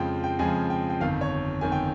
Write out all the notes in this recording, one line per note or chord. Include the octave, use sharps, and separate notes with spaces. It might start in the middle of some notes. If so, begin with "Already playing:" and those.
Already playing: F2 C#3 F3 G#3 G5
G5
F2 C#3 F3 G#3 G#5
G5
G5
G1 F2 D#3 F5
C#5
G1 F2 D#3 G#5
G5